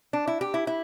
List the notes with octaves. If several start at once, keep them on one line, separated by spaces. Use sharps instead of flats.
D4
E4
G4
E4
E4